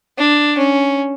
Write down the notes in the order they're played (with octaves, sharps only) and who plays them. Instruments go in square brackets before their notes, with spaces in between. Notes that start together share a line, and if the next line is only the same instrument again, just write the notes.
[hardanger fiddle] D4
C#4